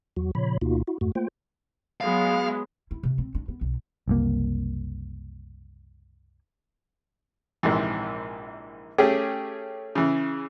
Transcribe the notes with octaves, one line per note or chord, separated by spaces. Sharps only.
E2 F#3 F#4
A#2 C#3 F3 C#5 B5
D2 B2 A#3 D#4 F4 F#4
E4 F#4
F2 G#2 A3 F#4
A3 A#3 F4 C5 G5
F#3 G#3 B3 F5
E4
C3
C4
D4
B3
B1
F#1 C2 A#3
A#1 G#2 C3 E3
A3 C#4 G4 G#4
C#3 E3